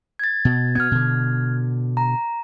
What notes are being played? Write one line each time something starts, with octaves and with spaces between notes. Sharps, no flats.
G#6 A6
B2
B2 B3 F6 G#6
B2 D3
A#5